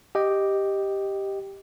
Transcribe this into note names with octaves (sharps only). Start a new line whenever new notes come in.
G4 D#5 G5